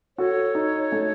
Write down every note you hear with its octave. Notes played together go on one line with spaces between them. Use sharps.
F#4 A4 C#5
D#4
A3